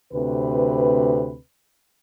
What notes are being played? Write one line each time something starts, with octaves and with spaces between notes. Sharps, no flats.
D2 C3 C4 B4